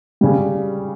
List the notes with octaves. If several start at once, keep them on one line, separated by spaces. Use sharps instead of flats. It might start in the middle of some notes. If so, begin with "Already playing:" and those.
C#3 G3